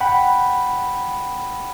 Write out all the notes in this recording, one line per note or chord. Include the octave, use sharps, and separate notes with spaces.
F#5 G5 B5